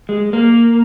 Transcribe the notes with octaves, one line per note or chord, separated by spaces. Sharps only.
G#3
A#3